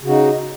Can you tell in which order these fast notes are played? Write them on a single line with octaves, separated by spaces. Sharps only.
C#3 F#4 D#4